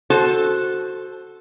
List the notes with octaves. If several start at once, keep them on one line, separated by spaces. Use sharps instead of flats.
F#4 A4 C5